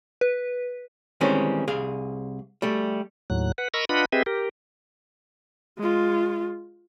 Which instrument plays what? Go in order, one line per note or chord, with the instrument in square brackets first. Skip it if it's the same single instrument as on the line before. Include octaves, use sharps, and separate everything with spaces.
[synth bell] B4
[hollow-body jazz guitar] D#3 E3 G3 G#3 C4 C#4
C2 G#4 F5
G3 A3
[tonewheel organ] D#2 A2 F#3 F#6
B4 F#5
A#4 D#5 A#5 B5 C#6 E6
D4 F4 B4 D#5 F#5 B5
C4 G4 G#4 B4 D#5 E5
G4 A#4
[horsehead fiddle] G#3 F4